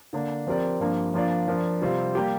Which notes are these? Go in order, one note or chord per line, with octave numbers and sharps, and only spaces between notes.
D3 A#3 D4
F3 C4 G4 A#4 D5
G2 F3 A#3
F3 A#3 D4 F4 D5
F3 D4 A#4
C3 G3 C4 F4
G3 A#3 G4